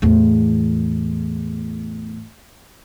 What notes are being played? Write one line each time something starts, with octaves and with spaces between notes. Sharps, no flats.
E2 A2